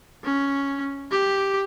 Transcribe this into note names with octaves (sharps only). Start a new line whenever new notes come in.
C#4
G4